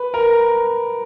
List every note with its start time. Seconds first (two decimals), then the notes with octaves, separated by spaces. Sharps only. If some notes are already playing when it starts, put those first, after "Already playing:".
Already playing: B4
0.14 A#4